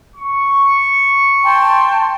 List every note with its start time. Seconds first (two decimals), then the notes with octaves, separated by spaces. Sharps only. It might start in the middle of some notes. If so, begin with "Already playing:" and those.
0.16 C#6
1.43 G5 A5 C6